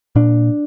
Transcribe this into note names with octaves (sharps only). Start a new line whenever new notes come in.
A#2 D4